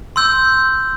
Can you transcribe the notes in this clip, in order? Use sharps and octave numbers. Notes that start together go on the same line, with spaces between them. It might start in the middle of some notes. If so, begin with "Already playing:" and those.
C6 E6 G6